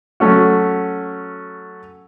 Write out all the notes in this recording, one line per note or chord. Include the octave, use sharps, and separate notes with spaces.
F#3 A3 C#4 F#4